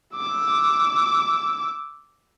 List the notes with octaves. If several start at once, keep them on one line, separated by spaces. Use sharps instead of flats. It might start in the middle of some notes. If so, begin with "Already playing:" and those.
D6 E6